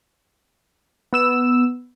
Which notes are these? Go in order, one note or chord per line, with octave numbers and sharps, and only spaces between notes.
B3 E6 E7